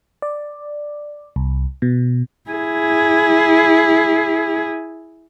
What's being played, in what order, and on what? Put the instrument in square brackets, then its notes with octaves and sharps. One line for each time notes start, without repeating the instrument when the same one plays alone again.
[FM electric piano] D5
C2
B2
[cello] E4 G#4